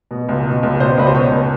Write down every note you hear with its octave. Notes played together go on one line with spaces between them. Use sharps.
B2
C#2
B2
C#2
B2 C5
C#2 B4
C5
B2 C#5
C#2